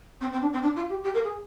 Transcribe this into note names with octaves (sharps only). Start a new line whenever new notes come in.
C4
C4
D4
C4
D4
F4
G4
G4
A#4
G#4